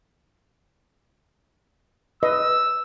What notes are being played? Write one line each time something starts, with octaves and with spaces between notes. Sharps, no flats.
B4 D#5 E6